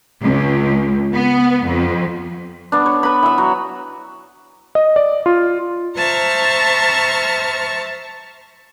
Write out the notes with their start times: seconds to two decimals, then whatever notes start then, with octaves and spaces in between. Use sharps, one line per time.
0.22 C#2
1.14 B3
1.64 F2
2.72 B3 D4
2.86 C#5
3.03 B4 B5
3.23 E3 E5
3.38 F#3
4.75 D#5
4.96 D5
5.26 F4
5.97 C5 E5 A5 A#5 C#6 F6